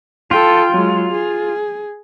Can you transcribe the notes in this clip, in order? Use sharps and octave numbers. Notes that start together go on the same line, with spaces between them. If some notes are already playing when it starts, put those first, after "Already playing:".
F4 A4 G5
F#3 G#3
G#4